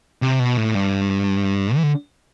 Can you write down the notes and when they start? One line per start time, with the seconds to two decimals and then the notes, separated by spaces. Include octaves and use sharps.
0.22 C3
0.40 B2
0.57 A2
0.74 G2
1.76 E3
1.83 D3